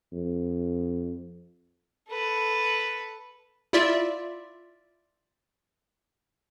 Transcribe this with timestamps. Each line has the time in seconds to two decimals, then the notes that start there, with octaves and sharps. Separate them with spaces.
0.13 F2
2.10 A4 B4
3.73 E4 F4 D5 E5